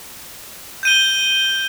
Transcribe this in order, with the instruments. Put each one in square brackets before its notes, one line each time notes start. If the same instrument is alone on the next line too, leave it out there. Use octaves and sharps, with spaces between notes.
[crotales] G6 D#7 G7